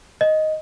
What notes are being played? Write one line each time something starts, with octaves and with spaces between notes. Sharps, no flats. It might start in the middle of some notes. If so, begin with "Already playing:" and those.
D#5